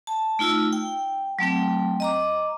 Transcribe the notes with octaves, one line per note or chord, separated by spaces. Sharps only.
A5
A3 D#4 F4 E6
G5
F#3 A3 C4 G5
D#5 A#5 D6